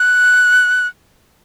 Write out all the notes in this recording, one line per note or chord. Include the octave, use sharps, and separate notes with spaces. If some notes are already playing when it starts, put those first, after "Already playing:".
Already playing: F#6